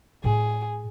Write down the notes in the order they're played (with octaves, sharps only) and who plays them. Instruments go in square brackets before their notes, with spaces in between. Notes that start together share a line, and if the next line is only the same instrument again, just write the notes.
[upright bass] A2 D#4 [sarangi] G#4